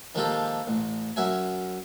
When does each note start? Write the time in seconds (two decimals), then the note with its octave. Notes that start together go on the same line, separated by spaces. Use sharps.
0.15 D#3 F3 G#3 A#3 G4 A4
0.67 A1
1.16 F#2 F#3 E5 G#5